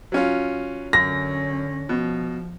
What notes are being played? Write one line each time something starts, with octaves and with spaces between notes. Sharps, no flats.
F#3 C#4 F4
F#2 D3 C#4 A#6
B2 F3